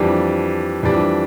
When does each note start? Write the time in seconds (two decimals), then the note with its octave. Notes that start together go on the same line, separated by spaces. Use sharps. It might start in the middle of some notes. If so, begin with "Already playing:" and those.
Already playing: F2 E3 G3 D4
0.83 F2 E3 G3 D4